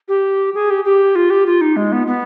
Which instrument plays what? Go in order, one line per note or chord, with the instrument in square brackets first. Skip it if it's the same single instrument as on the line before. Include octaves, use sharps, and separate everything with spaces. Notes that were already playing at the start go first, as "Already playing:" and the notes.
[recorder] G4
G#4
G4
G4
F4
G4
F4
D#4
G#3
B3
B3